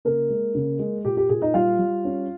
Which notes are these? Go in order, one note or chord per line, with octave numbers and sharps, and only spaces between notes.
C#3 A#3 A#4
G#3
C#3
G#3
A#2 G4
G4
A#2 G#4
D#4 D#5
G3 F4 F5
G3
C#4